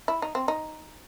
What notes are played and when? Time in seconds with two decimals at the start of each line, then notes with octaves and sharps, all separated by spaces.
0.08 E4
0.22 D#4
0.35 C4
0.48 D#4